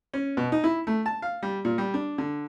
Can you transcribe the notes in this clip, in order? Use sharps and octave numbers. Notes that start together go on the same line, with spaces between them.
C#4
B2
D#4
E4
A3
A5
F5
G3
A#2
G3
D4
D3